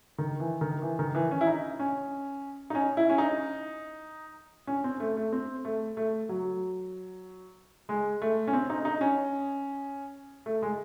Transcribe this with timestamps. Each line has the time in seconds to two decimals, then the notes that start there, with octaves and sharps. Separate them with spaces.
0.18 D#3
0.40 E3
0.61 D#3
0.82 E3
0.99 D#3
1.15 E3
1.31 C#4
1.41 E4
1.47 D#4
1.79 C#4
2.70 D#4
2.75 C#4
2.97 E4
3.09 C#4
3.18 D#4
4.67 C#4
4.84 C4
5.00 A3
5.17 A3
5.32 C4
5.65 A3
5.97 A3
6.29 F#3
7.89 G#3
8.22 A3
8.47 C#4
8.53 C4
8.70 D#4
8.85 D#4
9.01 C#4
10.46 A3
10.62 G#3